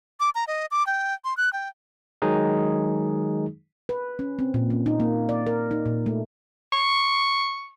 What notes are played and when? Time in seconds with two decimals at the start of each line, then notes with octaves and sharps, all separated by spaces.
0.20 D6
0.35 A#5
0.48 D#5
0.71 D6
0.87 G5
1.25 C6
1.37 F#6
1.53 G5
2.22 D#3 F#3 G#3 D#4 G#4
3.89 B4
4.19 C#4
4.39 C4
4.54 A#2
4.70 C#4
4.86 D#4
5.00 A#3
5.29 D5
5.47 A#4
5.71 D#4
5.86 A#2
6.06 A3
6.73 C#6